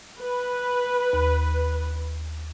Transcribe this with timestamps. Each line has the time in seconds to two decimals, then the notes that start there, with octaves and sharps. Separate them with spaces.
0.19 B4
1.13 D#2